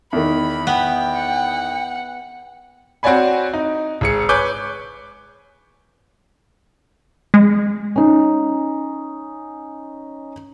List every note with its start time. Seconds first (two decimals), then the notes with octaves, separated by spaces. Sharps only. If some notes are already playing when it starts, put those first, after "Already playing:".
0.13 E2 D#3 B5
0.67 B3 G5
1.14 F#5
3.03 C4 F#4 C#5 D5 G#5 B5
3.53 D#4
4.01 G#1 G#4 C#7
4.29 B4 C#5 G#5 C#6 D6 G6
7.34 G#3
7.96 C#4 D#4